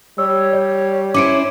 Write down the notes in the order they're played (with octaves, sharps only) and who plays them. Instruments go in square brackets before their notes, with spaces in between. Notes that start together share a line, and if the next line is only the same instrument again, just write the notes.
[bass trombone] G3 [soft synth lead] C#5 [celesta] E6
[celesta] D5
[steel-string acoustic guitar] C#4 E4 C5 [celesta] D6 C#7 D7